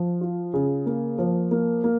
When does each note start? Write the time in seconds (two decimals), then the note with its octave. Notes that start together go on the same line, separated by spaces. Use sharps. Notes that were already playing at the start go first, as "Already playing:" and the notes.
Already playing: F3
0.21 F4
0.54 C#3
0.86 A#3
1.18 F3
1.51 A#3
1.84 A#3